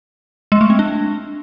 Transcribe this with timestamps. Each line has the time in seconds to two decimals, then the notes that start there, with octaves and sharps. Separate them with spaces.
0.52 G#3
0.61 A3
0.70 C4
0.79 D4